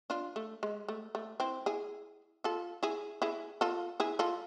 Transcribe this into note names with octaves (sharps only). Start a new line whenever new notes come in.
D4 F4
A3
G#3
A3
A3
C4 E4
E4 G#4
F4 A4
E4 G#4
E4 G#4
F4 A4
E4 G#4
F4 A4